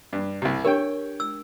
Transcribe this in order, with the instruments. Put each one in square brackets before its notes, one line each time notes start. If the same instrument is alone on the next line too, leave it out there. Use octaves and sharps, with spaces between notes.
[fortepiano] G2
C2 C3
[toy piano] D4 G4 A#4 [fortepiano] C#5 G5
[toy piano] E6